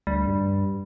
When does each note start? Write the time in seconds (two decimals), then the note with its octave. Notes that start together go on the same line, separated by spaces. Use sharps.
0.07 D2 G3
0.27 G2